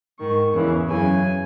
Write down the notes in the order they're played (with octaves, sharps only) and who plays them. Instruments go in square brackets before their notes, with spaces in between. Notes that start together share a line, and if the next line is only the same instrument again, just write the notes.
[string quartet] G#2 D#3 C#6
E2 C#3 E3
F#2 C#3 E3 G#5